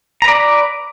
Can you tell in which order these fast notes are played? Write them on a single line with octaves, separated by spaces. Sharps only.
A#5 B4 D5